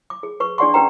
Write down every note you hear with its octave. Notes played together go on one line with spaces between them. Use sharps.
D6
G#4
B4 C#6
D4 G#4 D5 F#5 C6 C#6
C#4 G4 B4 F#5 G5 A#5